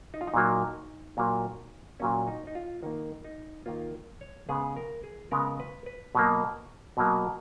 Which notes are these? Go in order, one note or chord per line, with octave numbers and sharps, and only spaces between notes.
D#4
F4
D#4
A#2 F#3 A#3
A#2 F#3 A#3
A#2 F#3 A#3 C#4
D#4
D#4
F4
D#3 A#3 D#4
D#4
D#3 A#3 F4
C#5
C#3 G#3 B3 G#4
A#4
G#4
C#3 G#3 B3 A#4
B4
B4
B2 F#3 A#3
B2 F#3 A#3